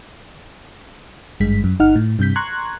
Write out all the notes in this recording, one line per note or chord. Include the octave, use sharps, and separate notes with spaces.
G#1 G2 G#3 B6
F#2
G1 D#4 F#5 F6
A2
G2 C3 G6 B6
A#5 C6 C#6 F#6 G#6